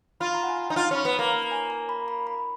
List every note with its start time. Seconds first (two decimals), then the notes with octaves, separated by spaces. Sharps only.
0.20 F4 B5
0.35 A#5
0.43 F#5
0.49 G#5
0.63 F#5
0.70 D#4
0.76 F4 F#5
0.91 C#4 B5
1.05 B3
1.14 B5
1.19 A#3
1.33 A#5
1.51 G#5
1.70 A#5
1.89 B5
2.08 B5
2.27 B5